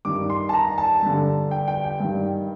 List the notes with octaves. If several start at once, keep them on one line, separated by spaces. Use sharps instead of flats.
G2 D#3 D6
C6
A5
A#5
A5
G2 D3
G5
G5
G5
G2 D#3